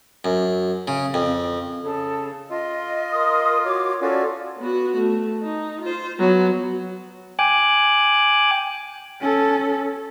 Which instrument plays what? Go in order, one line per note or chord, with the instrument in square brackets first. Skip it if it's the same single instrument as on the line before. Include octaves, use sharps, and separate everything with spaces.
[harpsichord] F#2
C#3
F2
[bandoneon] C#3 [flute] A4
[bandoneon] F4 [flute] D#5
[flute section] A#4 C6 D#6
[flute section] F#4 D6 [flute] C#5
[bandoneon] C#4 F4 F#4 [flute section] A4 D5
[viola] B3 F#4
A3
D#4
F4 C5
F#3 B3
[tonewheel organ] G5 G#5 D6 F#6
[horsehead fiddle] C#4 A4